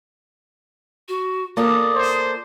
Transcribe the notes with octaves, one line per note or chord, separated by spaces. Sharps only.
F#4
A#3 F4 A4 D5 D#6
C5